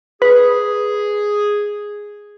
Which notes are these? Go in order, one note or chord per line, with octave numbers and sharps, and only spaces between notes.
G#4 B4